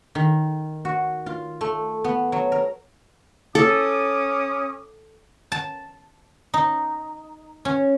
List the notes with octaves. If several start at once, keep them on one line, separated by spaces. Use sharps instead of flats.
D#3
F#4
F4
A3
B3
F#3
A#4
C#4 A4 D6 D#6
A5
D#4
C#4